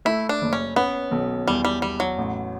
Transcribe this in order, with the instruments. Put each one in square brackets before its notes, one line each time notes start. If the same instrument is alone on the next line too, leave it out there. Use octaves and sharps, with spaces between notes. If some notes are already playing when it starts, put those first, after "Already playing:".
[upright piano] A3 [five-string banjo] E4
[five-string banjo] D4
[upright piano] F#1
[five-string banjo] C#4
[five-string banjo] B3 [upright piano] C#4
[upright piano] B1
[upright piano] E2 [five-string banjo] G3
[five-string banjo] G3
[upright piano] E2 [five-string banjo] G3
[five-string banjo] F#3
[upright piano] A1